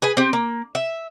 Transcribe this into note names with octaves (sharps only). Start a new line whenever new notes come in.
G#4 B4 G#5
C4 G4
A#3
E5